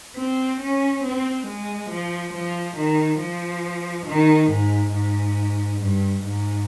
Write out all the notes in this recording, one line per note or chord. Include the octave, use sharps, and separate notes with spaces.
C4
C#4
C4
G#3
F3
F3
D#3
F3
D#3
G#2
G#2
G2
G#2